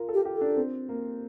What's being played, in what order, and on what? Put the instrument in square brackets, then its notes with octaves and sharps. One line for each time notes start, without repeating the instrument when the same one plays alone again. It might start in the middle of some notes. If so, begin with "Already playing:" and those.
Already playing: [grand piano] F4 A#4
A4
[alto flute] G4
[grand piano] G4
[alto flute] A4
[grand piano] D4
C4
A#3